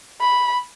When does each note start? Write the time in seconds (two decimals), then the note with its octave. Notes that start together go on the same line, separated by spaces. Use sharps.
0.21 B5